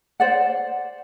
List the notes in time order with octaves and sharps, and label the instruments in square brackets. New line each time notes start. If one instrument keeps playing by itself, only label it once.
[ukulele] C5 D5 F#5